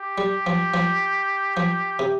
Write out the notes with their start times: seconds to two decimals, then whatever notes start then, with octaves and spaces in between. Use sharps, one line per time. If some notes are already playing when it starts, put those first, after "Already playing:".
Already playing: G4
0.18 G3
0.47 F3
0.74 F3
1.57 F3
1.99 C3